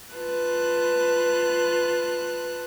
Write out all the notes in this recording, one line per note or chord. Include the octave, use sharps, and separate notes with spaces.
F4 B4 A5 F#6